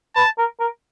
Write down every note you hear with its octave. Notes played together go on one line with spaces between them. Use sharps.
B4 A5
A#4
A#4